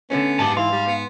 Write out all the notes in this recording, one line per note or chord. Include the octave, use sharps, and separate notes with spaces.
D3 A3 B3 C#4
G#2 G4 A5
E3 F5 C6
G3
B3